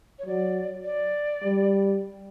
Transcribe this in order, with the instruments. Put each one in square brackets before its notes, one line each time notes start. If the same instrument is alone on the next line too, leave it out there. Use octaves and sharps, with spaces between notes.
[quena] C#5
[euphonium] F#3 [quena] D5
[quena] D5
[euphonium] G3